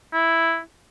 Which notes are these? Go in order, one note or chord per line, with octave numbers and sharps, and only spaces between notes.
E4